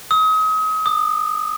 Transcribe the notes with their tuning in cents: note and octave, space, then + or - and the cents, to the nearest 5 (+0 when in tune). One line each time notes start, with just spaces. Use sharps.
D#6 +35
D#6 -35